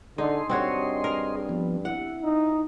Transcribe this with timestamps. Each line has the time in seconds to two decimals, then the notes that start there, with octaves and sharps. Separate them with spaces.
0.18 D3 D#4 G#4 D#5 C6
0.49 G2 C4 F#4 C#5
1.04 A#4
1.49 F3 B3
1.85 E4 F#5
2.22 D#4